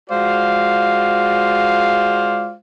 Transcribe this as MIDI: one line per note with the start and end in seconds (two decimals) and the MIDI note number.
0.10 2.53 56
0.10 2.53 65
0.10 2.53 66
0.10 2.53 72
0.10 2.53 74
0.10 2.53 77